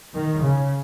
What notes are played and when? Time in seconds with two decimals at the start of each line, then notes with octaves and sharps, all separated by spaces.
0.14 D#3
0.42 C#3